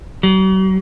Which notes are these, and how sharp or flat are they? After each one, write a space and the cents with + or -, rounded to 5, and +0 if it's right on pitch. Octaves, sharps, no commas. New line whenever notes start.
F#3 +45